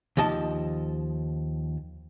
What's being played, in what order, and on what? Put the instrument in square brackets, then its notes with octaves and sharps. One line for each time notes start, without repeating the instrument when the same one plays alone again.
[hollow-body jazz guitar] D#2 F3 D#5 A5